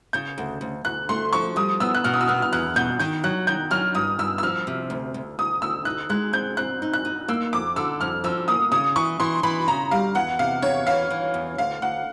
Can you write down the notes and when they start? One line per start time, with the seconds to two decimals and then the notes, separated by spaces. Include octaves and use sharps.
0.13 C#3 G6
0.38 D2
0.61 D2
0.85 D2 F#6
1.09 A3 C6
1.33 F3 C#6
1.56 G3 D#6
1.80 B3 E6
1.95 F#6
2.04 B2 F6
2.14 D#6
2.21 E6
2.28 B3 F6
2.42 F6
2.53 E2 F#6
2.76 B2 G6
2.99 D#3 G6
3.24 F#3 F#6
3.47 D#3 G6
3.71 F#3 F6
3.95 G2 D#6
4.19 G2 E6
4.38 E6
4.43 F3 F6
4.67 C3
4.90 D2
5.14 D2
5.39 D2 D#6
5.62 D2 E6
5.85 D#4 F#6
6.09 G#3 F#6
6.33 C4 G6
6.57 C4 F#6
6.82 D#4
6.93 F#6
7.05 D#4
7.28 A#3 E6
7.53 F2 D6
7.76 D3 E6
8.01 F2 F6
8.24 F3 E6
8.48 A#3 D#6
8.72 C#3 D#6
8.96 E3 C#6
9.20 E3 C6
9.43 E3 B5
9.68 C#3 A#5
9.91 G3 F5
10.15 E2 F#5
10.39 C3 F5
10.62 E2 C#5
10.87 E3 F5
11.10 E3
11.34 E2
11.58 D2 F5
11.82 D2 F#5